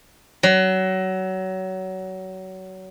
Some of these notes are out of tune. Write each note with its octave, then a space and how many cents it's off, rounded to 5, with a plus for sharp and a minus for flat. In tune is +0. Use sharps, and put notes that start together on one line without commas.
F#3 +25